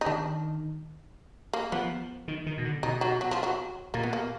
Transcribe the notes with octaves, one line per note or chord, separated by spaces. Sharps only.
D#4
D#3 D4
A#3
F3 B3
D#3
D#3
B2
D3
B2 D#4
F#3
F#3
F3
F#3
A#2 A#3
B3
A#3